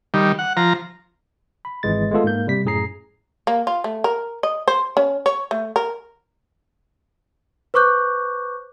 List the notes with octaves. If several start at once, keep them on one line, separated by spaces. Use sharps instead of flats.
D#3 G3
F#5
F3 A#5
B5
G#1 E3 G#3 A6
G#3 A3 B3 F4 A4
G#2 A#3 G6
C3 G3 B6
F#2 A2 G#4 A#5 C7
A#3
F4
A3
A#4
D#5
C5
C#4
C#5
A3
A#4
B4 C5 C#6 D6 F#6 G6